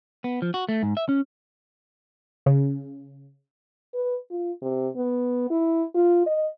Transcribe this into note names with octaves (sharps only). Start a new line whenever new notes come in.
B3
F3
F#4
A3
G#2
E5
C#4
C#3
B4
F4
C3
B3
E4
F4
D#5